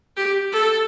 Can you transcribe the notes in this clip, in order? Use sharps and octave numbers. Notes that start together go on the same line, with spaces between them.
G4
A4